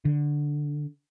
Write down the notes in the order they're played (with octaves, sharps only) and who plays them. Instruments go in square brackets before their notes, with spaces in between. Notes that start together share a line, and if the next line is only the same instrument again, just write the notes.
[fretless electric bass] D3